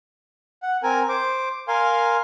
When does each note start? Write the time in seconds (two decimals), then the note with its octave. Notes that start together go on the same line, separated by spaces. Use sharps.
0.63 F#5
0.83 C4 A#4 G#5
1.09 C5 D6
1.68 A#4 F5 G#5 C6